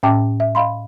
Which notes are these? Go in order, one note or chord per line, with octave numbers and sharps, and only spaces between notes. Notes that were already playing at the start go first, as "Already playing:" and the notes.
A2 C#4 E5 G5 A5 D6
E5
D#5 F5 B5 C6